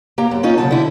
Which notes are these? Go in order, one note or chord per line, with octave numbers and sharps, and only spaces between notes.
A#3 G4 A#5
F#2
A#3 C#4 D#4 F4
C#3 F#3 A5
D3 E4